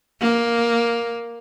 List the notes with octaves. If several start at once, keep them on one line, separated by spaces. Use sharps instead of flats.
A#3